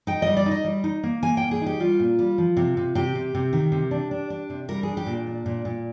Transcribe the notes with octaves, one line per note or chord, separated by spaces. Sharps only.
D#4 G5
G3 D#5
D5
D#4
D#5
G3
D#4
A#3
A#3 G#5
A#2 G5
G#4
D#4 G4
G3 F4
A#2
G3
F3
C3
C3
C3 G4
C3
C3
D#3
C3
D4
D4
D4
C3
G3 A#4
D4 G#4
G4
A#2
D4
A#2
A#2